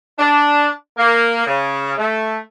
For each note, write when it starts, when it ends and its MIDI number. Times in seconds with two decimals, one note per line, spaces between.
0.19 0.69 62
0.98 1.44 58
1.47 1.95 49
1.98 2.40 57